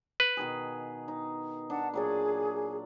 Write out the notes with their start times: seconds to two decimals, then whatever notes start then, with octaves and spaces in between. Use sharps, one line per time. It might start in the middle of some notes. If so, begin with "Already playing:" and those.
0.20 B4
0.37 B2 D#3 G#4
1.08 D#4
1.70 D4 F#5 A5
1.94 A#2 F#3 G#4 D5